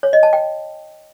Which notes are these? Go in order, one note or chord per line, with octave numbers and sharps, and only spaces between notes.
C#5
D#5
A5
G5